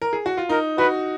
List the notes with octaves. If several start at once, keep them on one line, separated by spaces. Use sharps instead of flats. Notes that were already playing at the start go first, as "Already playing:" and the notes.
A#4
G#4
F#4
F4
D#4 A#4
F#4 B4